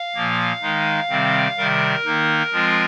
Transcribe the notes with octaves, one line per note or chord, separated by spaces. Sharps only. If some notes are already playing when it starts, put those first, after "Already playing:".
Already playing: F5
A#2 F3 A#3
D#3 G#3 D#4
C3 D#3 G3 C4
C3 D#3 G3 A#4
D#3 A#3 D#4
F3 G#3 C4 F4